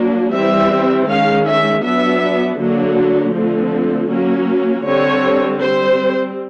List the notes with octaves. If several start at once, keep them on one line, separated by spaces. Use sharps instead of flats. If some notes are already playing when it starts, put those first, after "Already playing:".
Already playing: F#3 A#3 D4
E3 G3 C4 E5
D#3 G#3 C#4 F5
E5
F#3 B3 D4 E5
D3 F#3 A#3 D4
D3 F3 A3 C4
F#3 A#3 C#4
D3 G3 C4 C#5
G3 C4 C5